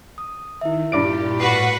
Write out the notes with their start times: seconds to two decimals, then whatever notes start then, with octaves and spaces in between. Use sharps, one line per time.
0.18 D#6
0.61 D#3 E4 E5
0.92 G2 A#2 E4 G4 D5 D7
1.40 A2 F#4 B4 F#6 B6 C7